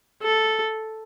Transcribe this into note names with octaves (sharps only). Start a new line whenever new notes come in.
A4